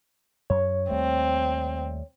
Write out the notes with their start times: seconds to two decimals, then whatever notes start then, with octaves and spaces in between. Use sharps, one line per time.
0.50 F#2 C#5
0.90 D#2 G3 A3 C4